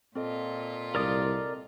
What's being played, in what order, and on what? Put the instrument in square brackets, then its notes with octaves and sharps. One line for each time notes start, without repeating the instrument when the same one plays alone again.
[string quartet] A#2 F4 [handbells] C4 A4 D#5
[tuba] C2 [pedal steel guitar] A#4 D5 D#6